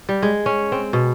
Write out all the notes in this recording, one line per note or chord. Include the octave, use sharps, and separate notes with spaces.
G3
G#3
C#4
C4
B2